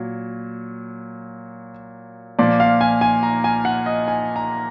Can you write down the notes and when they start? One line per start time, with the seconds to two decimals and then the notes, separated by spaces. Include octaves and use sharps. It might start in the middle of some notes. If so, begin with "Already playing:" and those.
Already playing: A#2 F#3
2.39 A#2 F3 D5
2.60 F5
2.81 G#5
3.01 G#5
3.23 A#5
3.44 G#5
3.65 F#5
3.86 D#5
4.08 G#5
4.36 A#5